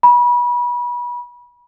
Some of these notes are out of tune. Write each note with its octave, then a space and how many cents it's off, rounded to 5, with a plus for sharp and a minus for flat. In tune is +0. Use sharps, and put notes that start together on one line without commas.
B5 -30